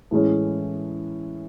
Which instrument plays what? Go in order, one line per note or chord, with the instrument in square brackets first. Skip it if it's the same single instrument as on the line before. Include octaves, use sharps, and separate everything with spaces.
[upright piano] A2 E3 G#3 C#4